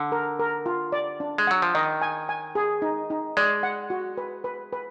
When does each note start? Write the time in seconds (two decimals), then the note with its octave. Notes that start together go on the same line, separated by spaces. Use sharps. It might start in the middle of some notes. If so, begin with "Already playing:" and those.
Already playing: D3
0.12 A#4
0.39 A#4
0.66 F4
0.92 D5
1.20 D4
1.38 G#3
1.47 F#3 F#5
1.62 F3
1.75 D#3 D#5
2.02 G#5
2.29 G#5
2.55 G#4
2.82 D#4
3.10 D#4
3.37 G#3 D5
3.63 F#5
3.90 F#4
4.18 B4
4.44 B4
4.73 B4